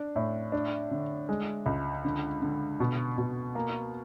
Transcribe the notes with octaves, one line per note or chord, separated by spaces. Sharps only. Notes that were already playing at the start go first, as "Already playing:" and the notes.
Already playing: D4
A2
D4
D3
G#3
C#2
D3
D3
B2
B2
A#3